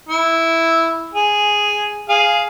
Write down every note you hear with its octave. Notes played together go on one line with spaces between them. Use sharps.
E4
G#4
G#4 F5